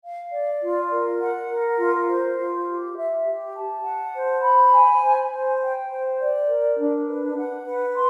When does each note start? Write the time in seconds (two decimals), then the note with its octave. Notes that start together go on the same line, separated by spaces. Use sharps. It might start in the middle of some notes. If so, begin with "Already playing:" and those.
0.02 F5
0.32 D5
0.61 F4
0.90 A#4
1.20 F#5
1.49 A#4
1.78 F4
2.07 C5
2.37 F4
2.67 G4
2.96 E5
3.25 G4
3.54 A5
3.83 F#5
4.14 C5
4.42 B5
4.71 G#5
5.01 C5
5.31 C5
5.60 G5
5.89 C5
6.19 D5
6.49 A#4
6.78 D4
7.07 B4
7.36 F#5
7.65 B4
7.94 C6